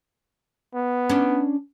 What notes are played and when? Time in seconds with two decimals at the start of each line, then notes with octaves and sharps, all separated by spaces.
0.75 B3
1.09 C#4 D4